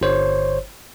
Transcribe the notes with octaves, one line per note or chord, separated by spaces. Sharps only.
G1 C5 C#5